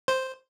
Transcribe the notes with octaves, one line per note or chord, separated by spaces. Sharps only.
C5